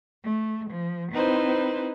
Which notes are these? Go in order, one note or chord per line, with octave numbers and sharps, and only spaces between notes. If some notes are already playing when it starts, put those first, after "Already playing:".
A3
F3
C4 D#4 E4 B4 C5